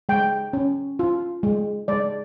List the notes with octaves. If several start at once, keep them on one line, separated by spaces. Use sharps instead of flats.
G#3 G5
C#4
F4
G#3
G#3 D5